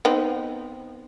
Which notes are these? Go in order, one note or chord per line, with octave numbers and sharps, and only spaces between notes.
B3 C4 D#4